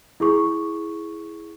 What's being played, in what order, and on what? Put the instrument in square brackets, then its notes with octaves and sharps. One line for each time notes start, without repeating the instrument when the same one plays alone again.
[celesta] E4 G#4 C#6